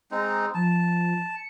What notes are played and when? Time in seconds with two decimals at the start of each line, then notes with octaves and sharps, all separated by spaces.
0.11 G#3 C4 D#4 A#5
0.54 F3 A5
1.35 C#7